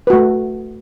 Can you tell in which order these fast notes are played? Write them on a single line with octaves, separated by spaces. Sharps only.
B4 F#4 A3